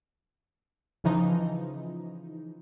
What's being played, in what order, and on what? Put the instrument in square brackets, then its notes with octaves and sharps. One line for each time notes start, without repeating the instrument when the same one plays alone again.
[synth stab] C#3 E3 F3 D#4